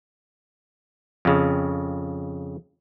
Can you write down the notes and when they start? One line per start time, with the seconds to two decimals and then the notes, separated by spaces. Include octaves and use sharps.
1.25 F2 C#3